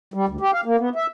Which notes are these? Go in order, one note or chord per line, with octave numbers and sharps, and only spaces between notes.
G3
D2
G4
F5
A#3
B3
E5